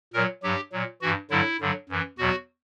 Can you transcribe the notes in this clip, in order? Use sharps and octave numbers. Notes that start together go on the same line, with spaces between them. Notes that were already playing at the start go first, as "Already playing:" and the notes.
A#2 F#3 A#4
G2 F#3 G4
A#2 F#3
G2 E3 F#4
G2 D3 F#3 E4
G2 D3 F#3
F#2 E3
E2 B2 F#3 F#4